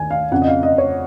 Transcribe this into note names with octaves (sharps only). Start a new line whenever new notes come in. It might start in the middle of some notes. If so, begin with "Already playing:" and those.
Already playing: D#2 D#3 G#5
F5
F2 C#3 F#5
D#5
F5
D#5
C#5